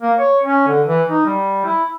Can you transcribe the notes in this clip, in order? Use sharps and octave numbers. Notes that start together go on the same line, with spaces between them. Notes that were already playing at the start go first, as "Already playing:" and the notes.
A#3
C#5
C#4
D3
E3
D#4
G3
E4